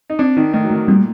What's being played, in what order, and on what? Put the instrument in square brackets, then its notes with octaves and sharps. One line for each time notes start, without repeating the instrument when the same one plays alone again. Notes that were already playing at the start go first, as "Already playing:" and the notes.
[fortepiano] D#4
[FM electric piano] C4 [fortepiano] D4
[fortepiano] D#3 [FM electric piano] D#4
[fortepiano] D#3 [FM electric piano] A3
[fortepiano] F#3
[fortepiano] D#3 [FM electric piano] A3
[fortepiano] A#2 [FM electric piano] G3